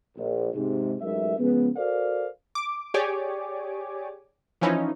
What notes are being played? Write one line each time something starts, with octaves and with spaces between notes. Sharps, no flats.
A#1
G#2 C3
A1 G#2 F#3 A#4 E5
C#3 F3 G#3 B3
F#4 A4 A#4 C5 D5 F5
D6
G4 G#4 C#5 D5 G#5 D6
E3 F3 C#4 D#4 E4